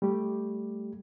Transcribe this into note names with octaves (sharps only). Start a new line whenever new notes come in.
G3 A3 G4